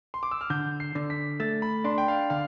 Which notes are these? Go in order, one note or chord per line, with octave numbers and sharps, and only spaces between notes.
C6
D6
E6
F6
D3 G6
C7
D3
B6
A3 A6
B5
D4 C6
G5
F5
D3 F5